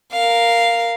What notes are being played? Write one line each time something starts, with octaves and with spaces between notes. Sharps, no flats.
A#4 F5